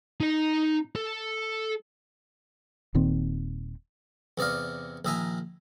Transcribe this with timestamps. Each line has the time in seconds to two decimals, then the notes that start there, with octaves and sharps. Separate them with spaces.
0.20 D#4 A#5
0.96 A4
2.95 D#1 A#2 D#3 C4
4.38 E2 C3 D5 D#5 F5
5.05 A#1 D#3 D#5 E5 G#5 A#5